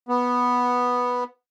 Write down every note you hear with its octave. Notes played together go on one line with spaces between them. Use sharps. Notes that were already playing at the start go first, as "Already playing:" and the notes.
B3